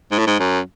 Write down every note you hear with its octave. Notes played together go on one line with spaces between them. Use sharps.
G#2
A2
G#2
F#2